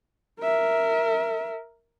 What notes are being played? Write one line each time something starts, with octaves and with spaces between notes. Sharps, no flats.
A#4 E5